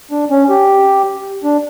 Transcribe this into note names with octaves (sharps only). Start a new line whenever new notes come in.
D4
C#4
G4
D4